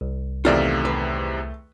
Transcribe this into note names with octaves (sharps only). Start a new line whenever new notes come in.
C2
E2 C3 D#3 A3 F4 D5 E5
B4